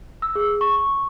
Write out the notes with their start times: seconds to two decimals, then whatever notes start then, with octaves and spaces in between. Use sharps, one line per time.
0.22 E6
0.35 G#4
0.61 C#6